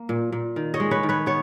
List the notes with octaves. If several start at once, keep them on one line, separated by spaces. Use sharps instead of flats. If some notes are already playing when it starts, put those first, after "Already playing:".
Already playing: A#3
A#2
A#2
D#3
C#5 D#5
G#3
B4 C#5
D#3
B4 C#5
B3 C#5